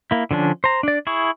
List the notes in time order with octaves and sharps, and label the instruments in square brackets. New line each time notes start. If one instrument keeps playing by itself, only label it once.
[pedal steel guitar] A#3 E4
D3 F3 C#4 D4
C5 A#5
D4 D5
E4 G#4 C#6